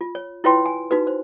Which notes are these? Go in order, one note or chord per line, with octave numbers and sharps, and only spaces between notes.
F4
C#5
E4 F4 B4 C#5 G5 C6
G#5
D#4 F#4 B4
C5